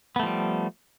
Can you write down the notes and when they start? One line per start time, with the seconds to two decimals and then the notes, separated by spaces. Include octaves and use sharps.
0.16 B3
0.19 A3
0.23 F3
0.26 G3